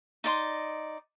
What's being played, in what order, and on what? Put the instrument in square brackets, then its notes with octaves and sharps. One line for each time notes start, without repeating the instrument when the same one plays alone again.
[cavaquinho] D#4 D5 D#5 C6